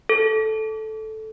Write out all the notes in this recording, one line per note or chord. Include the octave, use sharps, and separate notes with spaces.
A4